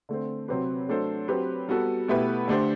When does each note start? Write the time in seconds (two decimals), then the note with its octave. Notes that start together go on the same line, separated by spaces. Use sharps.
0.09 D3 A3 C4
0.48 C3 F#3 C4 G4 B4
0.89 F#3 A3 D4 A4 C5
1.28 F#3 C4 G4 B4
1.68 G3 B3 F#4 A4
2.08 B2 A3 E4 G4 B4
2.48 D3 A3 D4 G4 C5